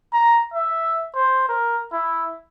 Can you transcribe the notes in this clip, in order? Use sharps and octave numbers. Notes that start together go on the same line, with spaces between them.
A#5
E5
C5
A#4
E4